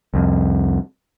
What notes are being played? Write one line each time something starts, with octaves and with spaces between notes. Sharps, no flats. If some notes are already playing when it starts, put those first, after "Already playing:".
C2 F2